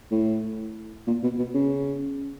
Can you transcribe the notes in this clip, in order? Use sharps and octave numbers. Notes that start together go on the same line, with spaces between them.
A2
A#2
B2
B2
C#3